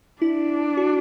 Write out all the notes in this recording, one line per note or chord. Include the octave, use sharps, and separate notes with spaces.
D4 E4
F#4